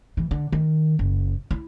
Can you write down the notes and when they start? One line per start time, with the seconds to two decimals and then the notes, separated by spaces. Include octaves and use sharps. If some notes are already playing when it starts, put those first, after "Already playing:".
0.17 E3
0.31 D3
0.52 D#3
0.99 F#1
1.51 E4